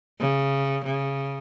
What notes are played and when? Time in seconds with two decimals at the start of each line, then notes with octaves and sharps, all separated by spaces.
0.20 C#3
0.85 C#3